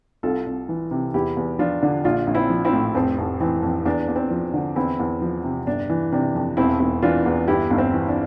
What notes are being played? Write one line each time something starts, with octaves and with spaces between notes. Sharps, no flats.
C2 F4 A4
C2
E3
C3
E2 E4 G4
E2
F3 D4 F4
D3
A#1 D4 F4
A#1
C4 E4
F3
C4 E4
A2
F1 C4
F1
E3 C4
F2
E2 D4
E2
C4
F3
D3
E2 C4 E4
E2
F3
C3
G1 D4
E3
C3 D4
F2
E1 C4 E4
E1
E3 D4 F4
E2
G1 E4 G4
G1
C4
E3
D4